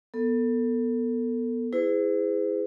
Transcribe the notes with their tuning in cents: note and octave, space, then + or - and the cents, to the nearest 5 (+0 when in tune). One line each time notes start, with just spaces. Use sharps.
B3 -15 A4 +25
E4 +0 G#4 -10 C5 -45